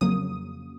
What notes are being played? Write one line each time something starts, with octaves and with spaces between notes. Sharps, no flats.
F2 C#3 F#3 A#3 D#6